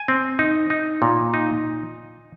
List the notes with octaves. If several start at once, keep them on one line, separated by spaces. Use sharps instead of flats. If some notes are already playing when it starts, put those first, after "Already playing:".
Already playing: G#5
C4
D#4
D#4
A#2
D#4